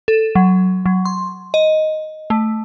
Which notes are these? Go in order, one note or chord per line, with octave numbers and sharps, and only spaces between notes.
A4
F#3
F#3
C6
D#5
A3